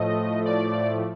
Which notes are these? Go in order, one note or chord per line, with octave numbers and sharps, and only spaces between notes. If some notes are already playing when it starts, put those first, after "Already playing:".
Already playing: A2 F3 A3 D#5
D5